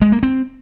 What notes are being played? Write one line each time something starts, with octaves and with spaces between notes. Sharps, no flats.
G#3
A#3
C4